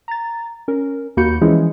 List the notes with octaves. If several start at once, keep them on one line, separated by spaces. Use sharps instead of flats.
A#5 A6
C#4 A#4
D#2 A#3 F#4 B5 G6 C#7
E3 F3 G#3 C#4 E4 G#4